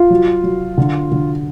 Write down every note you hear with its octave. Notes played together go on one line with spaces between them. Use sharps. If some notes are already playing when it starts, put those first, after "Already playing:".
Already playing: F4
F#3
F#3
D3
D3